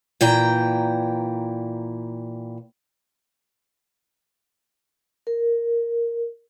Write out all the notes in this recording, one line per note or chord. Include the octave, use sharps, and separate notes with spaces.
A#2 E3 G5 A#5
A#4